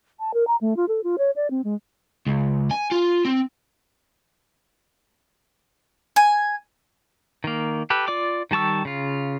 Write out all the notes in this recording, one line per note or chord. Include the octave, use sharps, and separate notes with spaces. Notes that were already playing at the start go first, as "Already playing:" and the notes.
A5
A#4
A#5
A3
F4
A4
F4
C#5
D5
C4
G#3
C#2
G#5
F4
C4
G#5
D#3 A#3
G4 A4 B4
F4 D5 D6
D#3 G3 A5 C#6 E6
C#3 F4